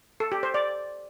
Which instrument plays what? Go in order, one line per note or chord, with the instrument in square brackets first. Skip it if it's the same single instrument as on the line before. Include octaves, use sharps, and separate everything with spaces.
[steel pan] A4
G4
C5
D5